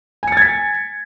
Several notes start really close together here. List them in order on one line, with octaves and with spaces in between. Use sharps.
G#5 C#7 A6 G#6 B6